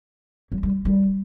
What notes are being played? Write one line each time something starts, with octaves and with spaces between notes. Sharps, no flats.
F#3
G3
G3